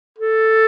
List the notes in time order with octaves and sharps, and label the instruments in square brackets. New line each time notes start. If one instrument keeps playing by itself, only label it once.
[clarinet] A4